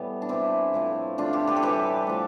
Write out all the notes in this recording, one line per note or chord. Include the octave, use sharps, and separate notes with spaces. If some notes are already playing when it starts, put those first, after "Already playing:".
Already playing: A2 E3 G3 A3 B3
D4
A2 E3 A3 C4 E4
A2 F3 A3
D3 A3 D4 F4
E4 G4
G4 B4
A4
A2 E3 G3 G4 B4
A2 F3 A3